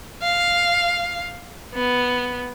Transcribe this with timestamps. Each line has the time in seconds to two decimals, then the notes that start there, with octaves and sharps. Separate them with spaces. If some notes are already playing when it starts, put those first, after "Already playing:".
0.22 F5
1.74 B3